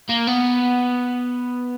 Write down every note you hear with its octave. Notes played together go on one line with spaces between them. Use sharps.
A#3
B3